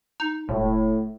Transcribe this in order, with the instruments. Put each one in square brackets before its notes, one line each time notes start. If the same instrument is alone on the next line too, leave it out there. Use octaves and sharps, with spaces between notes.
[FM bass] D#4
[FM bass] E1 [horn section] A2